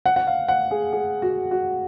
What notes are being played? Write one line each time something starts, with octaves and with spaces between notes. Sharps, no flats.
F#5
F#5
F5
F#5
G#4
G#4
F#4
F#4